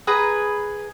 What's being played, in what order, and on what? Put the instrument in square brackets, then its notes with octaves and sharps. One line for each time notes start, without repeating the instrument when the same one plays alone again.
[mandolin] G#4 B4 A#5